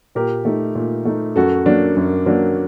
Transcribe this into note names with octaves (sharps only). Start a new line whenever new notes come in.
A#2 G4 A#4
A3 D#4
A#2
A3 D#4
F#2 F#4 A4
F#3 A#3 D4
F#2
F#3 A#3 D4